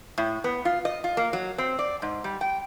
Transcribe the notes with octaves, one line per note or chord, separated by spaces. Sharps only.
A2
B3
F4
D#5
F4
A#3
F#3
C4
D5
G#2
G3
G5